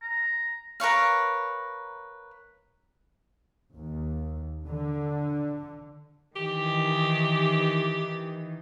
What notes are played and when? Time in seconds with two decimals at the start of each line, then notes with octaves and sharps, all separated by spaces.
0.02 A#5
0.80 A#4 B4 C#5 F5
3.75 D#2
4.65 D3
6.36 D#3 E3 G4